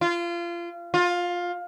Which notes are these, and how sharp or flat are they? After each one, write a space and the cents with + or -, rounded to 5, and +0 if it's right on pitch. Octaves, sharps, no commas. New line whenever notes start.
F4 -25
F4 +15